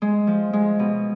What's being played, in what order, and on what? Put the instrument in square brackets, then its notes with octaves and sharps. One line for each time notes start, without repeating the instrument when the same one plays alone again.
[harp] G#3
F3
G#3
B2